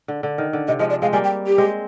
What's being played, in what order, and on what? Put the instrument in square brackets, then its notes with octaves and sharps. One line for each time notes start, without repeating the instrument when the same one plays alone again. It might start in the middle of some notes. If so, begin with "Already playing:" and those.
[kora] D3
D3
D#3
D3
[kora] C3 [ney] D#5
[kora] F3 G#3 [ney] D#5
[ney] D5
[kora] G#3 C4 [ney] F5
[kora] G3 A#3 [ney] G#5
[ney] G5
G4
[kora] G#3 C4